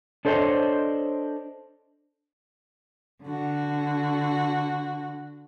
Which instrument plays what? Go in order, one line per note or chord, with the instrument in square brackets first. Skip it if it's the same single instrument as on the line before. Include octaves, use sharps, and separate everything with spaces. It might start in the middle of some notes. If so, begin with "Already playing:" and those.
[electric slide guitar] D4 A4 C5 C#5 D#5
[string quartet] D3 F#4